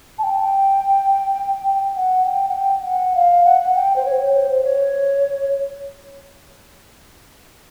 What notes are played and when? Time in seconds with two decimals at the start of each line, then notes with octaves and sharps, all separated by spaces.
0.18 A5
0.23 G5
1.96 F#5
2.26 G5
2.48 F#5
2.56 G5
2.86 F#5
3.15 F5
3.45 F#5
3.75 G5
3.96 C5
4.05 C#5
4.35 C5
4.63 C#5